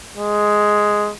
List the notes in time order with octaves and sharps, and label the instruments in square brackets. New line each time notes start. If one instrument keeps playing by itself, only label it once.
[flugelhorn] G#3